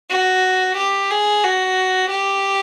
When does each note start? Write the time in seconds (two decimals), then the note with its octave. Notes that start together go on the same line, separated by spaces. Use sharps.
0.10 F#4
0.77 G4
1.11 G#4
1.44 F#4
2.10 G4